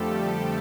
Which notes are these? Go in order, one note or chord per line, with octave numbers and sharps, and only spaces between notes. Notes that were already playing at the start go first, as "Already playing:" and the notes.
Already playing: F2 D3 F3 G3 A3 G4 A4